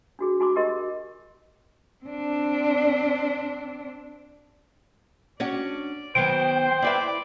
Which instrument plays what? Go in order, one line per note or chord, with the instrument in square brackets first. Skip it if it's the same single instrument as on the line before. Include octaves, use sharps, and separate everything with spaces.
[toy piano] D4 F#4 G#4
F#4 G#5 C6 D6
G4 A#4 D#5 C6
[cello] C4 D4
[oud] C#4 D4 F#4 [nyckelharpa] D5
[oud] D#3 F#3 B3 [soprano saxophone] C5 [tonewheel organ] G5
[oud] E4 B4 E5 [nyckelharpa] D5